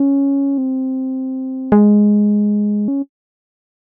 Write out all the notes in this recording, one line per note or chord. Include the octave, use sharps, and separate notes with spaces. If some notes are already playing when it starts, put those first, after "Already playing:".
Already playing: C#4
C4
G#3
C#4